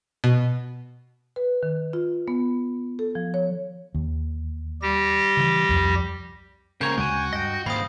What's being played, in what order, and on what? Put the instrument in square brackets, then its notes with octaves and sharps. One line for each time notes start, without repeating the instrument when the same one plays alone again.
[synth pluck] B2
[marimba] B4
D#3
F4
B3
A4
F3
C#5
[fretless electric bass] D#2
[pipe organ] G3 G4 A#6
[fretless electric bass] C#3 E3
C2 F2 F3
[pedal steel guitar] C#3 C#5 A#5 [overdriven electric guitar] A#3 C4 [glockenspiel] G6
[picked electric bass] D2 C#3 G#3 [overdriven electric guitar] F#4 [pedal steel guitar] G5 G#5
[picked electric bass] G2 [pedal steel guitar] D#5 G5 [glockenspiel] A#6
[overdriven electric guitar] D#2 C4 [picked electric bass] G#2 [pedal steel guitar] F5 [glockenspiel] B5 D#6